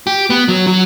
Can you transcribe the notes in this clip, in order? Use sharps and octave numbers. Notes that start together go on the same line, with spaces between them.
G4
B3
F#3
F#3